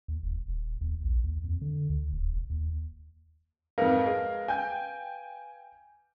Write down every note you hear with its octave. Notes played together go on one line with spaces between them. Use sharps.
D#2
E1
D#1
D#2
A#1
D#2
F2
D3
D2
D1
E1
D#2
F2 G#2 A#4 B4 F5
G#3
G5 G#5 G6